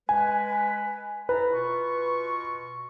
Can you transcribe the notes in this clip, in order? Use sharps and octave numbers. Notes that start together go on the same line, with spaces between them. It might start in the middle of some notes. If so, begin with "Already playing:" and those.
G#3 B4 G#5
E4 A4 B4 A#5
B2 F4 C#6